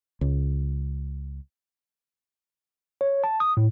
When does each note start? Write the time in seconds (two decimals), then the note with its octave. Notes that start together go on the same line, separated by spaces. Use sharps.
0.21 C#2
3.01 C#5
3.24 A5
3.40 D#6
3.57 A2